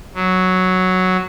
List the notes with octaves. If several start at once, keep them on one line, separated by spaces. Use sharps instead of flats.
F#3